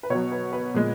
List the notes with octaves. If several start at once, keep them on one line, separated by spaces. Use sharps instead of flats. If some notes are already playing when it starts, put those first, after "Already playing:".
B4
B2 F#3 C#5
B4
B4
A#2 G#3